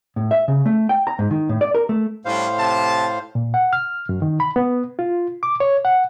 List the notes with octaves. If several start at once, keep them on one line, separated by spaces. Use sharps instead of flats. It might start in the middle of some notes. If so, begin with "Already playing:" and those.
A2
E5
C#3
A3
G5
A#5
G#2
D#3
A2
D5
A#4
A3
A2 G3 C#4 D4 C5 F5
C3 A5
A#2
F#5
F6
F#2
D#3
B5
B3
F4
D6
C#5
F#5